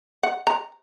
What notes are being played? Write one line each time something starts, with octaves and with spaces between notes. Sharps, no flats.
F#5
A#5